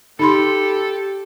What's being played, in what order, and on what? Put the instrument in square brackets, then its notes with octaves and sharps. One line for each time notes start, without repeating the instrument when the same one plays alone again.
[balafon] D#4 B5 C6 [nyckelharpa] G4 [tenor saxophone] A4